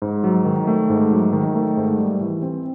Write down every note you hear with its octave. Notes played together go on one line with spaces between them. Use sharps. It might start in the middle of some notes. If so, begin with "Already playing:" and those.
G#2
F#3
D#3
A3
G#2
F#3
D#3
A3
G#2
G3
E3
C4